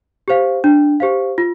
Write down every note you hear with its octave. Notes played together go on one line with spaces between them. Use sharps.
G4 C5 F5
D4
G4 C5 F5
F4